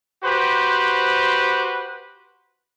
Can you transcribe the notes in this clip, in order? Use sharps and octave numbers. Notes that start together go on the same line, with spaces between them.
F#4 G4 B4 C5